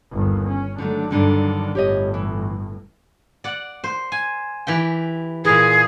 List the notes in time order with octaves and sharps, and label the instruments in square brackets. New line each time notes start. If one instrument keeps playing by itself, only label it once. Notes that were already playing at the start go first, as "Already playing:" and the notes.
[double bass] G1 D#2
C#4
[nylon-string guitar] D3 D#3 A3 [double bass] F#3 D4
[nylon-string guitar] G2 D3 D#3
[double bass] G1 A2 [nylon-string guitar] G4 C#5 D#5
[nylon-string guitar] E3
[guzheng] D5 F#5
C5
G#5
E3 G4 G5
[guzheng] A#2 E3 [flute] G#4